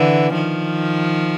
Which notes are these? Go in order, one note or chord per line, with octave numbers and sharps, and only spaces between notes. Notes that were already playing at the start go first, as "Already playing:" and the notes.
Already playing: D3 E3
D#3 F3